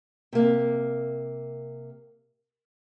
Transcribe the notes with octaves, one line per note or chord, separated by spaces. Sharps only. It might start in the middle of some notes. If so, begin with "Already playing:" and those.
C3 A#3